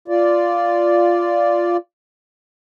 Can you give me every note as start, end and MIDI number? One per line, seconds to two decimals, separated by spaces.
0.08 1.77 65
0.08 1.77 74